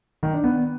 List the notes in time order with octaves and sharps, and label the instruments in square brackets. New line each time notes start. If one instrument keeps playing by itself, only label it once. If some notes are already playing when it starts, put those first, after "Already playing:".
[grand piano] D#3
D4
B3